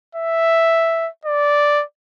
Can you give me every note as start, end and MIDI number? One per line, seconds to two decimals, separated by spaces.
0.15 1.09 76
1.25 1.84 74